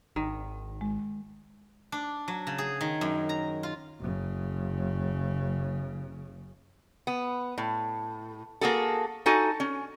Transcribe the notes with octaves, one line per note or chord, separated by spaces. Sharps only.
G#1 D#3
G#3
D4
F#3
C#3
G#4
D#3
F#2
A#5
F4
F#1 C#3
B3
A2
A#3 F#4 G#4 A4
D#4 F#4 A4 G#5
C#4